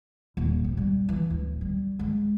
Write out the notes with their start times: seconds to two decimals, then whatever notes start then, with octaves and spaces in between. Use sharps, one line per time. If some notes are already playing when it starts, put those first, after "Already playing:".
0.37 D#1
0.64 C3
0.77 G3
1.09 E3
1.30 D1
1.61 G3
1.99 G#3